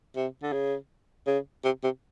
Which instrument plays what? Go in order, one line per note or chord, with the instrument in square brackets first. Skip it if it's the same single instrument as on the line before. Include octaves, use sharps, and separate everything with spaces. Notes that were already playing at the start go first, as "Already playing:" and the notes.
[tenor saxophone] C3
D3
C#3
C#3
C3
C3